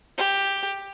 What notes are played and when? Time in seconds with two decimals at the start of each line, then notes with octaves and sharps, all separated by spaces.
0.18 G4